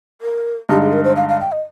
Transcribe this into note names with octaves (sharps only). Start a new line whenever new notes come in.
A#4
G2 D3 G#3 D#4 G4
G#4
A#4
C5
F5
F5
G5
D#5